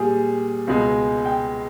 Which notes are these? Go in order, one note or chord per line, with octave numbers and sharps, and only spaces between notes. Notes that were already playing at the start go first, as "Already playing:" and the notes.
Already playing: A#2 G3 G#4
C#2 B2 G#3
G5